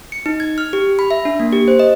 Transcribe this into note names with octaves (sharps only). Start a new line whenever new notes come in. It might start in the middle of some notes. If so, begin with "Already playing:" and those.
C#7
D#4
G#6
F6
G4
B5
E5
D4
A#3
G4
C5
D#5